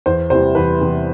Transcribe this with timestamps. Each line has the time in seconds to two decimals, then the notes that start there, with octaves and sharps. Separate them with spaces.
0.06 E2 C5
0.30 C3 E3 G3 C5
0.55 E2 B4
0.81 C3 E3 G3